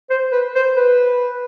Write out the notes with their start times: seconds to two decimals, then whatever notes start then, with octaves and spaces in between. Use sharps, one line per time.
0.10 C5
0.32 B4
0.55 C5
0.77 B4